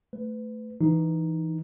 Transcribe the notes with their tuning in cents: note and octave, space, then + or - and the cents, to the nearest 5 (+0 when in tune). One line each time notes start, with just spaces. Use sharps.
A3 +0 B4 +25
E3 +0 D#4 +0